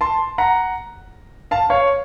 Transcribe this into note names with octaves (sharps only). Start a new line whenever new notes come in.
A5 C6
F#5 A#5
F5 A5
C#5 F5